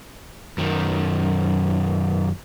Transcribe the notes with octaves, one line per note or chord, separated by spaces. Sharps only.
F#2 D#3